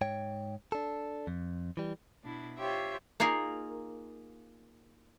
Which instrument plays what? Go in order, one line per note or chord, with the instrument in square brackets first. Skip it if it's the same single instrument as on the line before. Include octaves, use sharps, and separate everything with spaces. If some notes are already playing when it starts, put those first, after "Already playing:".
[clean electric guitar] G#2 C#5 G5
D4 A4
F2
E3 G3
[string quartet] B2 D4 E4
F4 G4 C5 C#5 E5 G5
[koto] A#3 D#4 F4 G#4 A#4